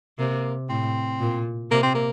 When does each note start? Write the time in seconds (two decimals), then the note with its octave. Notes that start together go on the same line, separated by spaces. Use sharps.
0.18 C3 A#3
0.69 A2 C4
1.20 A#2
1.71 C3 A#3
1.83 C4
1.94 A#3